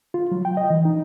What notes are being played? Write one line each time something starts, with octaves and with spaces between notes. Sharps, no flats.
F4
F#3
G5
D#5
E3
D#4